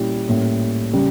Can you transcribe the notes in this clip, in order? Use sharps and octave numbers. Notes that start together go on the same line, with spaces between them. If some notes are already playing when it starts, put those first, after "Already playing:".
Already playing: A#2 G3 C#4 E4
A2 G3 A#3 C#4
C#3 G3